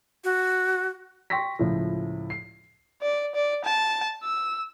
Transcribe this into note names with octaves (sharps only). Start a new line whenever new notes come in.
F#4
G5 C6 C#6 A#6 B6
C#2 A2 F3
C7
D5
D5
A5
E6